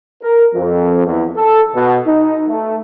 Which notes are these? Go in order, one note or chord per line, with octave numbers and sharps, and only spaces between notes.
A#4
F2
E2
A4
B2
D#4
A3